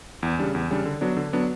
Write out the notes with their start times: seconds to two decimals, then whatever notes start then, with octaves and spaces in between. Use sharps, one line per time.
0.23 E2
0.39 C#3 G3 D4
0.55 E2
0.70 C#3 G3 D4
0.85 D3
1.01 F#3 B3 D4
1.17 D3
1.33 F#3 B3 D4